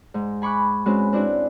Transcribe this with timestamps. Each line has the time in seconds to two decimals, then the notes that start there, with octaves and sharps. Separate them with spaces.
0.14 G#2
0.42 G#5 B5 C#6 D6 F#6
0.86 G#3 C4 C#4 F#4 B4
1.13 C4 D4 E4 F#4